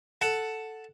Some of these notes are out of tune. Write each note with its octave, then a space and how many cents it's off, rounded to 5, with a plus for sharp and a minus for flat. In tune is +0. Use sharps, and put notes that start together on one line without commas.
A4 +0 F#5 +0